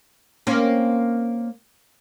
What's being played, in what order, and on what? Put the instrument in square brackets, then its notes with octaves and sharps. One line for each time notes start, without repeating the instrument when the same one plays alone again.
[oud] A#3 C4 C#4